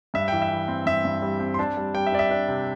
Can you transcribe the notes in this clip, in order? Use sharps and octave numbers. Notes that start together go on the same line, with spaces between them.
G2 E5
E3 G5
E5
E3
C4
G2 E5
G2
G3
C4
C6
D4 A5
G3
G3 G5
E5
D4 D5
E5
D4
C3